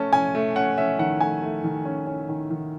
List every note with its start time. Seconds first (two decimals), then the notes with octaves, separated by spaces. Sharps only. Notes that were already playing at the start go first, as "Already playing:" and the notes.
Already playing: A3 C#4 A5
0.13 C#4 G#5
0.35 A3
0.56 C#4 F#5
0.78 C#4 E5
0.99 D#3 F#5
1.21 A3 G#5
1.42 A3
1.64 D#3
1.85 C#4
2.07 C#4
2.28 D#3
2.50 D#3